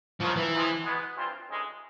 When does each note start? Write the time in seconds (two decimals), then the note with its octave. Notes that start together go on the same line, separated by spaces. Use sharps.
0.21 G2 D#3 F3 F#3 A#3 C#4
0.37 E3
0.52 E2 C3 F3 G#3 C4
0.84 B2 G#3 B3
1.16 G2 E3 G3 C4 F4
1.48 D2 C#3 E3 G#3